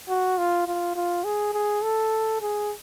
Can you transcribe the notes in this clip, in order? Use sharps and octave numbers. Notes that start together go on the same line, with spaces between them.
F#4
F4
F4
F4
G#4
G#4
A4
G#4